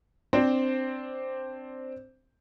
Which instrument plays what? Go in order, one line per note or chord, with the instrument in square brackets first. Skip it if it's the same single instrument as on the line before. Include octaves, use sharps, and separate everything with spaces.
[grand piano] C4 D4 C5